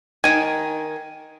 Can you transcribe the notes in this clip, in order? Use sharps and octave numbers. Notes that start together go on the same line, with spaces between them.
D#3 G#5